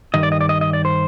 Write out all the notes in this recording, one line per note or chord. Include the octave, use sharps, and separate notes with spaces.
G2 D#3 D#5
D5
D#5
D5
D#5
D#5
D5
C5